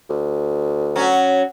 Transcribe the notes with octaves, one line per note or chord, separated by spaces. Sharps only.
D2
F#3 C#4